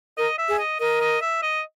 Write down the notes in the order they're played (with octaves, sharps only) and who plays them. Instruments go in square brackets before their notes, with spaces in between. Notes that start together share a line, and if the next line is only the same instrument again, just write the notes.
[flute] A#4 [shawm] D#5
[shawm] E5
[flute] G#4
[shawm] D#5
[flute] A#4 [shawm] D#5
[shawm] D#5
E5
D#5